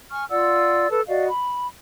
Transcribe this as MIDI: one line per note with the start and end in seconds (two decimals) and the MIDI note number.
0.11 0.24 80
0.11 0.24 85
0.11 0.24 89
0.30 0.89 65
0.30 0.89 74
0.30 0.89 78
0.30 0.89 88
0.90 1.01 69
0.90 1.01 71
0.90 1.01 81
1.08 1.27 66
1.08 1.27 74
1.08 1.27 75
1.08 1.27 77
1.27 1.67 83